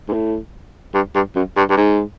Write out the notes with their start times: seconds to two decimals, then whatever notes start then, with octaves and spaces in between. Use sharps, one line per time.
0.08 G#2
0.13 A2
0.94 G2
1.15 G2
1.36 F#2
1.57 G2
1.70 G2
1.77 G#2